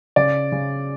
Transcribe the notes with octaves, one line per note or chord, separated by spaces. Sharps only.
C#3 D5
C#3